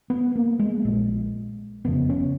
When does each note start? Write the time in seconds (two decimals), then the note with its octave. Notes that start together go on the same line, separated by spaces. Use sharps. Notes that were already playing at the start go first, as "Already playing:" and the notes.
0.10 B3
0.36 A#3
0.59 G#3
0.85 A#1 A#2
1.85 F1 F2 C#3 B3
2.09 C#4